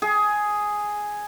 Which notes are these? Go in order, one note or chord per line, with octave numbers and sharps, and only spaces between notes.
G#4